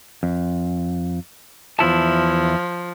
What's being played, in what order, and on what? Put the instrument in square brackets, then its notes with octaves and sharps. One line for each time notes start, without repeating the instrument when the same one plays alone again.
[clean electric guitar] F2
[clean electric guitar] E2 E4 A5 [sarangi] F3